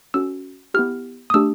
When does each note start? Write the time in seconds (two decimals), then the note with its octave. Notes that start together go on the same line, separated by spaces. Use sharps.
0.14 C#4 F#4 A4 E6
0.74 B3 E4 G4 F6
1.30 D#6
1.34 A3 D4 G4 E6